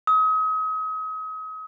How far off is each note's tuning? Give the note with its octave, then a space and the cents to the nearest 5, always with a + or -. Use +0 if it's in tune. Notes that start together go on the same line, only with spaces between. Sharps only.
D#6 +35